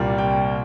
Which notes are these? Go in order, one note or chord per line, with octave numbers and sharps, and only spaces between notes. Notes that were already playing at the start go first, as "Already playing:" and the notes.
Already playing: C2 A#2 G3 A#3
G5